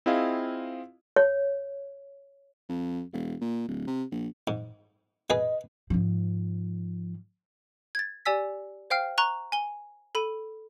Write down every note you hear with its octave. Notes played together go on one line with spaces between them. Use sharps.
C4 E4 F4 G#4 D#5 F5
C#5
F2
E1
A#2
D1
C3
A#1
G#2
B2 G#4 B4 D#5
G#2 F3
G#6 A6
G4 D5 G#5 E6 B6
C5 F5 G5 F6 C7
A#5 C#6 F#6 G7
G#5 G7
A4 B5 D#7